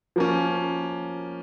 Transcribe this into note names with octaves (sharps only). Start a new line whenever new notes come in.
F3 A#3 C#4